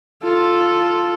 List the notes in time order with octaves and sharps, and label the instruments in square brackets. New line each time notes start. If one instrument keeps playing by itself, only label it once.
[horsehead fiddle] F4 A4